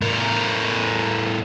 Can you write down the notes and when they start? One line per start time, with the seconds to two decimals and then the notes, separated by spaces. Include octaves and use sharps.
0.02 A2 A#4